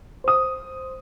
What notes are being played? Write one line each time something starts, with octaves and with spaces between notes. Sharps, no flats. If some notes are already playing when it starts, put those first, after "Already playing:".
C5 D#6